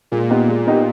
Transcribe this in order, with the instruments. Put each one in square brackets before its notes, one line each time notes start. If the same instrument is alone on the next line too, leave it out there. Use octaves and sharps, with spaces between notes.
[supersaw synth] A#2 [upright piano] G#3
[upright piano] B3 D#4 G4
G#3
B3 D#4 G4